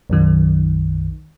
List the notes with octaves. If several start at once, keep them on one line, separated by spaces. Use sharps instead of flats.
B1 F#2 D#3